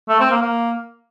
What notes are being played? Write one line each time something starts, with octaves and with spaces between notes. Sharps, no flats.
A3
C4
A#3
A#3